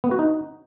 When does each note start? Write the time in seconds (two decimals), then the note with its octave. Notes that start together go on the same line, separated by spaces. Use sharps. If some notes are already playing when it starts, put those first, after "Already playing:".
0.04 B3
0.11 F#4
0.19 D#4